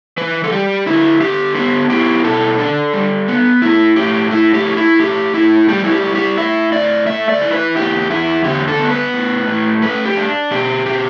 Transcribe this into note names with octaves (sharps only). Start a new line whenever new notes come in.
E3 B4
A4
G3 G4
D3 E4
D3 G4
B3 G4
E4 G4
B2 A4
D4
G3
B3
A2 E4
A2 G4
A3 E4
G4
E4
E4
A2 G4
A2 E4
G3 G4
E4
G4
E4
G4
A2 E5
A2 D5
A3 E5
D5
E4
B4
E2 G4
E2 E4
D3 G4
A4
B3
B4
A2
A2
A3 B4
G4
D4
B2 G4
B2 G4